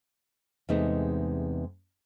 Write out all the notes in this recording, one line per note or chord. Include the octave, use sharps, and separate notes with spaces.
E2 C3 G#3 A3 D#4